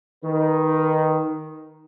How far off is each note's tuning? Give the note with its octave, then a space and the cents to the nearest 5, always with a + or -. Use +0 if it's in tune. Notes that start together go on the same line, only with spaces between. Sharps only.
D#3 +0 B4 -25